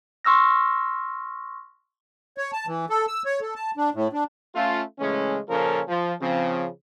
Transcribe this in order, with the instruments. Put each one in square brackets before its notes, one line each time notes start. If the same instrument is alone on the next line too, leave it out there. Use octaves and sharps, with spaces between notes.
[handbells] C6 C#6 E6 F6 A#6
[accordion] C#5
A5
E3
A4
E6
C#5
A4
A5
D4
A2
D4
[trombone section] A3 C#4 F4
C#3 E3 G#3 A3 C#4
A#2 C#3 F3 C#4 A4 A#4
F3
C#3 F3 C4